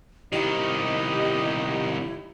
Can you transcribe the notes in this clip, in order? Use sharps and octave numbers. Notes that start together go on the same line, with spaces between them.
C2 D#3 D#4 E4 G4 D#5